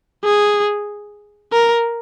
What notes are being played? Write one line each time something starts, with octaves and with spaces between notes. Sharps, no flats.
G#4
A#4